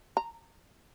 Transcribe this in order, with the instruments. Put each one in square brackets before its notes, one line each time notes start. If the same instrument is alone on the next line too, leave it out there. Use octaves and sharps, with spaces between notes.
[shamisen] A#5